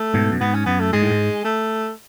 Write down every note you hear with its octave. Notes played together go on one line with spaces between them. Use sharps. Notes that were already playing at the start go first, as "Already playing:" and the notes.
Already playing: A3
G#2 B2
F#2
G#2 B3
C#4
F#2 B3
A3
G#2 G#3
A2
G#2
A3